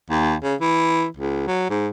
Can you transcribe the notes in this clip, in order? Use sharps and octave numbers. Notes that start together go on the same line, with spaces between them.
D#2
C#3
E3
C#2
F#3
G#2